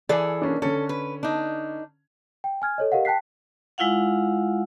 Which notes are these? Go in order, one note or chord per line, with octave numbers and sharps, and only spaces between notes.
E3 G#4 A4 D5
A#3 C#4 D4
D3 C#4 A4
B4
D4 D#4
G5
G#5 F6 G#6
A4 C#5 D#5
G4 A#4 D#5 F5 F#5
G5 A5 F#6 B6 C7
G#3 E4 F4 F5 F#5